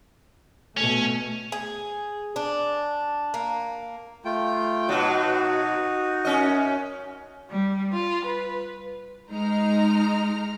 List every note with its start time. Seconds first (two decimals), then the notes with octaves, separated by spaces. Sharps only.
0.77 B2 A3 C#4
1.52 G#4
2.36 D4
3.34 A#3
4.25 A3 F4 G5
4.89 B2 F#3 D#4 F#4
6.25 F#2 C#4 D#5
7.50 G3
7.92 F4
8.26 B4
9.30 G#3 D#4 A#5 F6